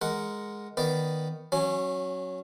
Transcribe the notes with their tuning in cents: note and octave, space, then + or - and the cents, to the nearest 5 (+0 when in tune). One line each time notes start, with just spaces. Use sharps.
G#3 +0 A#4 +0 F#5 +0
D#3 +0 B3 +0 D5 +0
F#3 +0 C#4 -25 G#5 +0